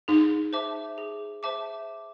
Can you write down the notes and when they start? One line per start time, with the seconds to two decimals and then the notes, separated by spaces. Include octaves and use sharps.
0.08 D#4 G#4
0.53 C5 E5 A5 D6
0.98 G#4
1.43 C5 E5 A5 D6